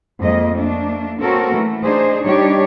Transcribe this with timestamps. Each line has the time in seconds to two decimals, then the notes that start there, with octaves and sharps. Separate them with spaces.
0.22 F2 G#3 A#3 D#5
0.54 A3 A#3 D4
1.21 A#3 C4 C#4 F#4 A4 A#4
1.54 E3 A3
1.83 D4 D#4 G#4 C5
2.24 G3 D4 D#4 G4 C#5